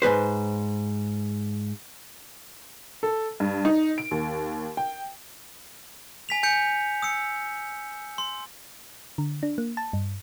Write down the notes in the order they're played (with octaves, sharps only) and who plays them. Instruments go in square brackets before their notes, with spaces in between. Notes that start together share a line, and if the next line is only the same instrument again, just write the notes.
[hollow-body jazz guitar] G#2 D#3 B4 C5
[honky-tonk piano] A4
G2
D#4
D7
D#2
G5
[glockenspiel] G#5 B6 F7
G#5 G6 C#7
D#6 E6 C#7
C6
[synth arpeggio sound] D3
D4
A#3
A5
G2